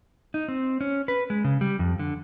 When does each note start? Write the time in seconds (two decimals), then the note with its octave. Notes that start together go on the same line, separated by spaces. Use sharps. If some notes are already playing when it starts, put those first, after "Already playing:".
0.34 D#4
0.48 C4
0.81 C#4
1.08 B4
1.30 G#3
1.44 C#3
1.61 G3
1.79 F2
1.99 D3